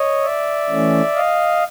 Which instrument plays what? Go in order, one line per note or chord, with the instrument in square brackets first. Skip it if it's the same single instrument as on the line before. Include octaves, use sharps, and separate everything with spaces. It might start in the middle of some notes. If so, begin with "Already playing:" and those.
Already playing: [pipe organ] C#5 D#5
D5 E5
E3 A3 C#4
D#5 F5